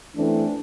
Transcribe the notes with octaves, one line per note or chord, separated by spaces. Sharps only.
E3 A3 C4 D4